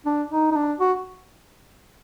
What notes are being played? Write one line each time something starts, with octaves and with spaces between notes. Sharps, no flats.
D4
D#4
D#4
D4
F#4